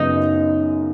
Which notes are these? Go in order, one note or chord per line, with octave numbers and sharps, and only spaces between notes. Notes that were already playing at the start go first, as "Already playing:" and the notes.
Already playing: F#2 C#3 F#3 B3 D#4